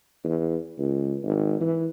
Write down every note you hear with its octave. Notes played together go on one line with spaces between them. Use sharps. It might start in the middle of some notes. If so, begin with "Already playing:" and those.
E2
C#2
G#1
E3